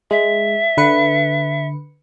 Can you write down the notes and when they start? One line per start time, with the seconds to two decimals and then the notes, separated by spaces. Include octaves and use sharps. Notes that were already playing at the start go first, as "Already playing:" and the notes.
0.11 G#3 E5
0.77 D3 B4 C#7